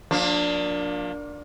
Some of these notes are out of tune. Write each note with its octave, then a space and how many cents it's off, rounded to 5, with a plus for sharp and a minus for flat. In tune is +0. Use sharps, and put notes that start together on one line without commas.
F3 +45 A#3 +0 D4 +0